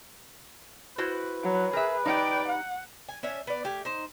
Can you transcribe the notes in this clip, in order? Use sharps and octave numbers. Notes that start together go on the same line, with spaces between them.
E4 F#4 B4 C5
F#3
G#4 A#4 E5
D#4 G4 D5 G5
F#5
G#5
C#4 D4 E5 G#5
B3 D5
A3 G4 F5 G#5
D#4 C5